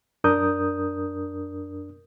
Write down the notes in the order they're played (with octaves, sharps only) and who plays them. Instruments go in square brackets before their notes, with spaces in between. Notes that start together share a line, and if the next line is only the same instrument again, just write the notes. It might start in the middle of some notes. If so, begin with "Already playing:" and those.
[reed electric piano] F#2 D4 A#4 D#6 G6